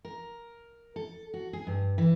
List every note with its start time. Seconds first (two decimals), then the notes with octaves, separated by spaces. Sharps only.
0.05 A#4
0.96 A4
1.34 F#4
1.53 G#4
1.67 G2
1.98 E3